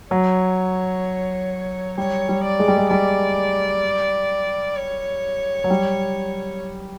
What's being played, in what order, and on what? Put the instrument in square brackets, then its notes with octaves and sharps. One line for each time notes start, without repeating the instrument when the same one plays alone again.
[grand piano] F#3 [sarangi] C#5
[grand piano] G3 [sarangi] C#5
[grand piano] G3
[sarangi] D5
[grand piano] G#3
G3
G#3
[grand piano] G3 [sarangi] D5
[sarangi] C#5
[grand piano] F#3
G3